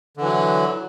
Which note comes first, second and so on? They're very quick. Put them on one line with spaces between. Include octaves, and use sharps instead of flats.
D3 E3 F#3